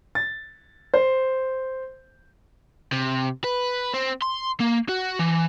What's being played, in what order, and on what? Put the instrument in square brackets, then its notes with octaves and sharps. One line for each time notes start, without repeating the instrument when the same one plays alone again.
[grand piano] A6
C5
[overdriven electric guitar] C3
B4
C4
C6
A#3
F#4
E3